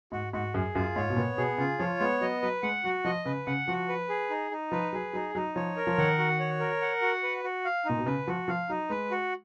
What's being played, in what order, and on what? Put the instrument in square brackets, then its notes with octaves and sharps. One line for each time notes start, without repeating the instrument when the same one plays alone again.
[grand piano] G#2 [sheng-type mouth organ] F#4
[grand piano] G#2 [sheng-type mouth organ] F#4
[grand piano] F#2 [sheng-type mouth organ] G#4
[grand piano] F#2 [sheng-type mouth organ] F4
[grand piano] G#2 [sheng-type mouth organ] C#5
[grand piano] B2
[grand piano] A#2 [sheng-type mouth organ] B3
[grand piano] B2 [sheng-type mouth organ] G#4
[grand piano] C#3 [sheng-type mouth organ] F4
[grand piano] F3 [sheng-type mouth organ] C#5
[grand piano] G#3 [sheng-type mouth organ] B3
[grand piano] F#3 [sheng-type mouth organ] D#5
[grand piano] F#3 [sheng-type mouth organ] B4
[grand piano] G#3 [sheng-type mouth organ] F#5
[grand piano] F#3 [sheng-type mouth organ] F#4
[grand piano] F3 [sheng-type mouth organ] D#5
[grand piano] C#3 [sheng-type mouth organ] B4
[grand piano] C#3 [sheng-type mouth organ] F#5
[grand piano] F3 [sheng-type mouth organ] F#4
[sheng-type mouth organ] B4
G#4
D#4
D#4
[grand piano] F3 [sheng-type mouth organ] B4
[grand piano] F#3 [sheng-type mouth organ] G#4
[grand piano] F#3 [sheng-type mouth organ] D#4
[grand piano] F#3 [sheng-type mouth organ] D#4
[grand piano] F3 [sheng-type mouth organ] C#5
[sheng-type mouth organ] A#4
[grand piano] F3
[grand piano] D#3 [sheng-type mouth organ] F#5
[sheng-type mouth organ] F#4
C#5
A#4
F#5
F#4
B4
F#4
F5
[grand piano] A#2 [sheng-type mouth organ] D#4
[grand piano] B2
[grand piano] C#3 [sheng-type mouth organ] B4
[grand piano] F3 [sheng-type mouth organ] F#4
[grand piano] F3 [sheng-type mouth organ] F5
[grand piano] F#3 [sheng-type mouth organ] D#4
[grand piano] G#3 [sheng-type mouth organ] B4
[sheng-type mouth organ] F#4